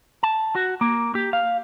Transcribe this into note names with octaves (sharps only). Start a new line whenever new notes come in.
A5
F#4
A#3
G4
F5